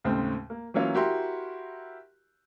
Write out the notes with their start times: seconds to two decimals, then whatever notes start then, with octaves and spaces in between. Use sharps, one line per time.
0.04 D#2 A2 C#3 G#3 C4
0.50 A#3
0.74 E3 F#3 A#3 C#4 F4
0.95 E4 F#4 G4 A#4 A#5 C6